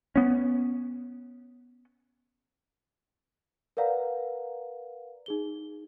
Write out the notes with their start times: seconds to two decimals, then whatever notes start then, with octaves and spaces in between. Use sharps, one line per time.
0.16 B3 C#4
3.77 A#4 B4 D5 F5 F#5 A#5
5.26 D#4 G#4 G7